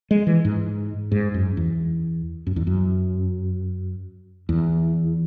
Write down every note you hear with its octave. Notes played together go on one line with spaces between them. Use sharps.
G#3
E3
G#2
G#2
F#2
E2
F#2
E2
F#2
E2